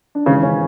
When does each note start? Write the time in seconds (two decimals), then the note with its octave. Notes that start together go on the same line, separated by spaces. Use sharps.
0.15 D4
0.26 G#1 G#2 C#3 E3 C#4
0.43 C#3 C#4